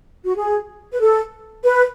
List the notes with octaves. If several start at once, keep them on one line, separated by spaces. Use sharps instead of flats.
F#4
G#4
B4
A4
B4